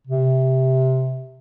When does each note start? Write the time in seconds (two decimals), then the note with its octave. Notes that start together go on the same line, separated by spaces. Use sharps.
0.07 C3